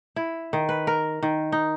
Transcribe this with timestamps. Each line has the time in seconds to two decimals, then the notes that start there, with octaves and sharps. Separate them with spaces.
0.16 E4
0.53 D#3
0.69 B4
0.87 A#4
1.23 D#3
1.52 D#4